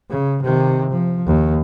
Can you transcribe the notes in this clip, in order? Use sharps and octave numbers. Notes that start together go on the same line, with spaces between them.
C#3
C3 D#3
F3
D#2